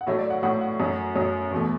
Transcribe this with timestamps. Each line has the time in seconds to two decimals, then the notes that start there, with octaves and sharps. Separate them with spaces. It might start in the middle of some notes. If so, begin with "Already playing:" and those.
0.01 F#5
0.07 A2 F#3 A3 E5
0.19 D5
0.30 F#5
0.43 A2 F#3 A3 F#5
0.61 F#5
0.80 F#2 F#3 A3
1.15 F#2 F#3 A3
1.51 E2 B2 A3